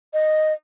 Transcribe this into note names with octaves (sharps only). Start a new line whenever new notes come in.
D#5